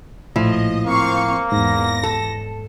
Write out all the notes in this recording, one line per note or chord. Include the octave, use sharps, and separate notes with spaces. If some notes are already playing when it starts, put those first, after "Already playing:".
A#1 A2 F3 E4 D#5
A#3 C4 F5 C#6
E2 G#2 A#6
A4